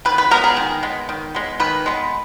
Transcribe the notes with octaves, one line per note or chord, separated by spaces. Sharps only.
D#3 B4
B4
G#3 B3 A#4
G#4
D#3
G#3 B3
D#3
G#3 B3
D#3 B4
G#3 B3